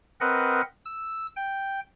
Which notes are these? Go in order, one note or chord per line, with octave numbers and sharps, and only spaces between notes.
C4 A#4 B4 D#5 F#5
E6
G5